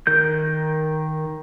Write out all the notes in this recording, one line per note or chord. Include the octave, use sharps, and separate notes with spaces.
D#3 A#4 G6